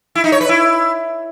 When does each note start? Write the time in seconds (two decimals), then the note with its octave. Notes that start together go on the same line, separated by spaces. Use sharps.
0.15 E4
0.24 D#4
0.32 C#5
0.41 B4
0.49 E4